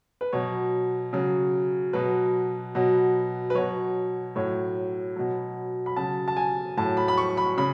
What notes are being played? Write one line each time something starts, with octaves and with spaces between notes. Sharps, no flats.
B4
B2 F#3 C#5
C#3 F#3
B2 F#3 B4
B2 F#3
B4
B2 F#3 C#5
A2 F#3 C#5
B2 F#3
B5
C#3 F#3 A5
A5
G#5
A2 F#3 A5
B5
B5
C#6
B5
C#3 B5